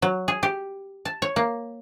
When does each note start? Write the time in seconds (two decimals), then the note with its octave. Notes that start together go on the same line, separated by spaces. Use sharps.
0.02 F#3
0.28 G#4
0.43 G4
1.05 A5
1.22 C#5
1.36 A#3